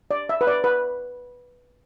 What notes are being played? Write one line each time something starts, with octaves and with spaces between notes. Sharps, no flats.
D5
E5
B4
D5
B4